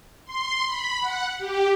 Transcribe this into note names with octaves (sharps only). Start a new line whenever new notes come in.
C6
B5
F#5
G4